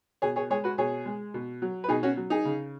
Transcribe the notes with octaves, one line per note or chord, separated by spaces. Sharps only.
B2 G#4 C#5
G#4 C#5
G#3 G#4 C#5
F#4 B4
B2 G#4 C#5
G#3
B2
F#3
B4
B2 D#4 G#4
C#4 F#4
F#3
D#4 G#4
C#3